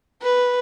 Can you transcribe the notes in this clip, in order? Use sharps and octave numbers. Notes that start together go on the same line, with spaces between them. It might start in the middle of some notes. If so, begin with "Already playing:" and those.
B4